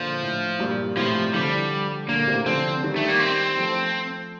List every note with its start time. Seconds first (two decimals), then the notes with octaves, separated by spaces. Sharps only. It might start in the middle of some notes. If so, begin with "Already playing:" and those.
Already playing: A#2 D3 F3
0.22 A2
0.59 G2 A#2
0.97 A2 C3 F3
1.34 D3 F3 G3
2.08 A#2 D3 A#3
2.27 A2 C3
2.45 D3 F3 C4
2.83 D#3 G3
2.96 A3
3.08 A#3
3.20 C4
3.57 F3 A3